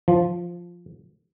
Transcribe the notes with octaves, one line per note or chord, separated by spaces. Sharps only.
F3